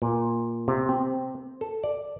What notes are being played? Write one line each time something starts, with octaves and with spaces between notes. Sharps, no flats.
A#2
C3
C4
A4
D5